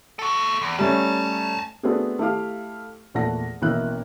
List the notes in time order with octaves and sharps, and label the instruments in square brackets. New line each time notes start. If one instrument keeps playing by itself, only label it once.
[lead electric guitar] F#4 A4
E2
[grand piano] G3 A3 C#4 [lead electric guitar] G#5 A5
[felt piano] A3 B3 C4 D4 F#4 G#4
A3 E4 G4 F5
E2 A#2 A3 F#5 A#6
A1 B2 A#3 E4 E5 F#6